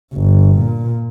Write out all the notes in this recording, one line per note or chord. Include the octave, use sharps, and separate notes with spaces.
G1
A#2